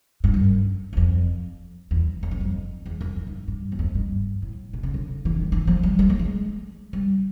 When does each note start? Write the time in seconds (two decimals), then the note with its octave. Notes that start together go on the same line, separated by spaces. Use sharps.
0.24 G2
0.34 F#2
0.93 F#2
0.97 F2
1.91 E2
2.23 F2
2.31 F#2
2.40 F2
2.86 E2
3.01 F2
3.16 F#2
3.27 G#2
3.48 G2
3.72 E2
3.79 F2
3.95 G2
4.42 A2
4.73 B2
4.83 C#3
4.94 D3
5.25 E3
5.36 D#3
5.52 E3
5.67 F3
5.83 G3
5.99 G#3
6.10 A3
6.19 G#3
6.93 G3